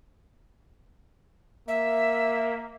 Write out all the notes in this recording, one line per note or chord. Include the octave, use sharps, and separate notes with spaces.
A#3 E5